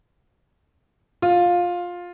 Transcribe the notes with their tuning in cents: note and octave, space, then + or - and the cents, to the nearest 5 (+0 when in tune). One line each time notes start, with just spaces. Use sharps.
F4 +15